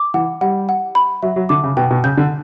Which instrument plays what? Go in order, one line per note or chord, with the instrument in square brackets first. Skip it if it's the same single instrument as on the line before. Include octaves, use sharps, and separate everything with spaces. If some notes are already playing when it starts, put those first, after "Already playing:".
Already playing: [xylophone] D6
[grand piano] E3 [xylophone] F#5
[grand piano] G3 [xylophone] F#5
[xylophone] F#5
B5
[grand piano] F#3 [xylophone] E5
[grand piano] F#3
[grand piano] D3 [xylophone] D6
[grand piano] C#3
[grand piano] B2 [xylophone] G5
[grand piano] B2
[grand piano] C#3 [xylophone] G6
[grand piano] D3